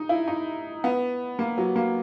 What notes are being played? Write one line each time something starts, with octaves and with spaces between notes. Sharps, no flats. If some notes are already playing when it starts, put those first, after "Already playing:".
Already playing: D#4
E4
D#4
B3
A#3
F#3
A#3